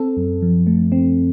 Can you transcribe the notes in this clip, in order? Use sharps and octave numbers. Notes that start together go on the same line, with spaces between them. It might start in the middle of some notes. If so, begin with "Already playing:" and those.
Already playing: C4 A4
F#2
F3
A3
C4